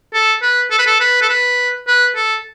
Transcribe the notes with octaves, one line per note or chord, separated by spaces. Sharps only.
A4
B4
A4
B4
A4
B4
A4
B4
B4
A4